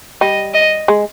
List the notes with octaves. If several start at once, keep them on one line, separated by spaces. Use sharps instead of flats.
G3 D#5
D#5
G#3